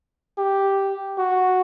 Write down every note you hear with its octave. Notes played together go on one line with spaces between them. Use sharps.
G4
F#4